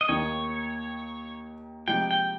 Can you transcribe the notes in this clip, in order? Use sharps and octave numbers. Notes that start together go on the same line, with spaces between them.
D#5
D#2 D#3 A#3 D#4 C#5
C3 F3 G#3 D#4 G4 G5
G5